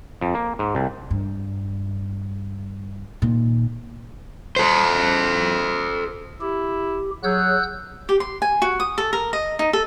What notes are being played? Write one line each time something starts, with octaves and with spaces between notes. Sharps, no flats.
F2
A#3
G#2
C2
G2
A#2 D#3
A4 C5
E4 G4
F#3 G#4 C#5 F#5 E6 F#6 G6
G4
C6
G#5
F#4
D#6
A4
A#4
D#5
D#4
A4